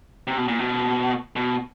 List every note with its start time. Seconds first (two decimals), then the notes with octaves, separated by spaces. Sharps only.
0.27 C3
0.37 B2
0.48 A#2
0.59 B2
1.36 B2